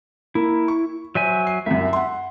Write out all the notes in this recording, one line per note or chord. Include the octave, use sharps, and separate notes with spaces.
A#3 E4
C#6
F#3 C5 E5 G#5
C7
C2 F#2 E5
F#5 C6